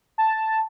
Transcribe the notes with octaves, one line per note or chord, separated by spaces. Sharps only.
A5